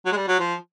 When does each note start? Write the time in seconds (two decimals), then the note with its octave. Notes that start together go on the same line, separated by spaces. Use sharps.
0.06 F#3
0.12 G#3
0.17 G3
0.28 F#3
0.40 F3